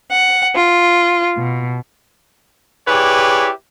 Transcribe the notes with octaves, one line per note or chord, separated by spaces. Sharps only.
F#5
F4
B2
E4 G4 G#4 B4 C#5 D5